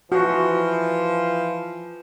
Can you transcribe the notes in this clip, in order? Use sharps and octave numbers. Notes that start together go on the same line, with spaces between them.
E3 F3 F#4